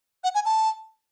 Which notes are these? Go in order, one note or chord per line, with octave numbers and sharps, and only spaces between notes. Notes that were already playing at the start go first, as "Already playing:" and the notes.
F#5
G#5
A5